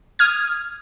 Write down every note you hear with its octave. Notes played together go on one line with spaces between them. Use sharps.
D#6 F6 G#6